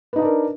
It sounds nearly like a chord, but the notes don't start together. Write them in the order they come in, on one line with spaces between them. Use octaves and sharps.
B4 D#4 D#5 D4 A#4